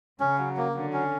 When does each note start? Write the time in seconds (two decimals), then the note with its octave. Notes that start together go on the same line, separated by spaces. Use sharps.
0.20 C#3 C#4
0.39 F#3
0.57 A#3
0.74 D3 F#3
0.93 C#4